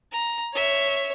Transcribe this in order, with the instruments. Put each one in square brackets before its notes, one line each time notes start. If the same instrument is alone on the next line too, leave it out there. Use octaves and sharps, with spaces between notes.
[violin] A#5
[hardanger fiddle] C#5 [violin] E5